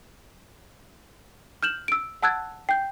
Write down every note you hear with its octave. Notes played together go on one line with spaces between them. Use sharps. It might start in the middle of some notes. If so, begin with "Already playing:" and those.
F6 G6 E7 F#7
E6 D7
F#5 A5 E6 F#6 G#6 A6
G5 G6